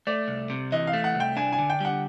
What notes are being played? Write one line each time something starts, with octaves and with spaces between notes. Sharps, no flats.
A3 D5
C2
C3
E3 D#5
F5
A3
F#5
C2
G5
D4 G#5
G#5
D3
G5
G3 F#5